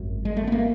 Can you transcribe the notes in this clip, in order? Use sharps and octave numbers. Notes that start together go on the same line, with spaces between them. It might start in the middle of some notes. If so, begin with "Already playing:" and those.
Already playing: G#1 F#2
G#3
A3
B3
A#3